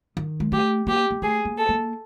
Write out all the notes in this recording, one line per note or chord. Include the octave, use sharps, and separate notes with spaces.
D#3
G#3
A3 G4
A#3 G4
A#3
A3 G#4
A#3
A4
A#3